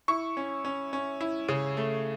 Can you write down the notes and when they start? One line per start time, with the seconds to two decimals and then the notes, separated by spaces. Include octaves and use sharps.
0.08 E4 C#6
0.37 C#4
0.65 C#4
0.93 C#4
1.21 E4
1.49 C#3
1.77 A3